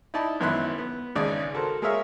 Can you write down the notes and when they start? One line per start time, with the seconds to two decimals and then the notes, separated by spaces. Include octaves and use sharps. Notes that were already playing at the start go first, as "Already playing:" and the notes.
0.14 D#4 E4 D5 A5 B5
0.40 G#1 F#2 B3 E4 C6 F#6
0.78 B3
1.15 G#1 C#2 C#3 G#4 D5 D#6
1.54 F#4 A4 A#4 C5
1.82 G#3 G#4 A#4 C#5 E5 F5